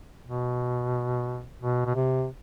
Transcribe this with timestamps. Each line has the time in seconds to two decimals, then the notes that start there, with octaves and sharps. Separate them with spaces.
0.24 B2
1.61 B2
1.86 B2
1.95 C3